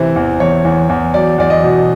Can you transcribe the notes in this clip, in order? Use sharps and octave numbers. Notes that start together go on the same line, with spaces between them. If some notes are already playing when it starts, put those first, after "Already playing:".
Already playing: C3 E3 C5
E2
E2 C#5
E2
E2
F#3 D5
E2 D5
D#5
B2